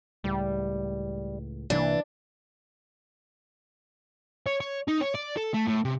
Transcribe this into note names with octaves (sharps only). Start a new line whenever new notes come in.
C#2 A2 G3
C2 C3 E3 A#3 D4
C#5
C#5
D#4
C#5
D5
A4
A3
A2
C3